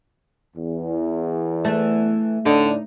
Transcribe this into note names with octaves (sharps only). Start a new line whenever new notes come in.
E2
E3 A3
A2 D3 D4 D#4